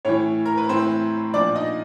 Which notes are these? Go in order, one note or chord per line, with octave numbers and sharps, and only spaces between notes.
A2 E3 C#4 C#5
A#4
B4
A2 E3 C4 C5
A#2 F3 D4 D5
D#4 D#5